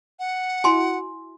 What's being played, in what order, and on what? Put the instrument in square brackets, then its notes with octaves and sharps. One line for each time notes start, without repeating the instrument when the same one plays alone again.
[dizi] F#5
[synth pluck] E4 F#4 [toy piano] G#5 C6